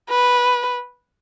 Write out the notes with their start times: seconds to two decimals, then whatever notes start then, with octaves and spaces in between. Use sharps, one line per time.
0.10 B4